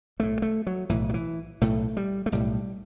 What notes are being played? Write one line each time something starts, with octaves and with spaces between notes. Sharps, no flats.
B1 A2 A3
A3
F#3
B1 A2 E3
F#3
E3
B1 A2 A3
G3
A3
B1 A2 G3